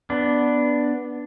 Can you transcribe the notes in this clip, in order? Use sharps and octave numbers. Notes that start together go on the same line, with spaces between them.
B3 D4